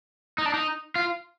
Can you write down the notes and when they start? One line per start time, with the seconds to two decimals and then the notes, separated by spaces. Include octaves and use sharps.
0.38 D#4
0.46 D4
0.54 D#4
0.96 F4